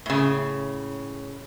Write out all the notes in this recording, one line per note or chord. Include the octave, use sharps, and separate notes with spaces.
A2 C#3